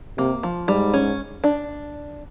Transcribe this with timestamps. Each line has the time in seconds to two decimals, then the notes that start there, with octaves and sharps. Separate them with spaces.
0.18 C3 A#3
0.43 F3
0.68 G#2 G3
0.93 C#4
1.44 D4